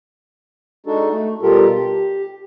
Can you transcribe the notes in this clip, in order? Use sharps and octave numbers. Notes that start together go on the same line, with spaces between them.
G#3 D4 D#4 F#4 A4
A3
B2 G3 F4 G4 A4 A#4
G4